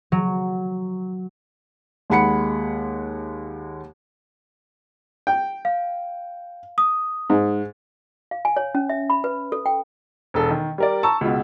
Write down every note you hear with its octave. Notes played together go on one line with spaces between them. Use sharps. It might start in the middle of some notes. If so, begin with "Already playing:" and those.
F#3
D#2 G#3 F#5 B5 C#7
G5
F5
D#6
G#2
F5
G#5
C#5
C#4
E5
B5
B4
A4
G5
E1 A4
D#3
G3 A#4 D5
A5 A#5 C#6 E6
C#2 B2